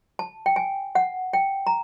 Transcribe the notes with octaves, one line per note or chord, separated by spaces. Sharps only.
A5
G5
G#5
F#5
G5
A#5